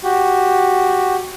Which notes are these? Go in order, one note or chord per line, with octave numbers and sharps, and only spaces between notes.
F#4 G4